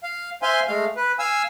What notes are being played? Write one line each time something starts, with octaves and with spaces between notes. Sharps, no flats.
F5
C5 E5 F5 G#5 C6
G#3 A3 F5
B4
F5 G#5 E6